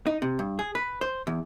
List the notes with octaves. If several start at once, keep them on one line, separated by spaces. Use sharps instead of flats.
D#4
C3
G2
G#4
B4
C5
E2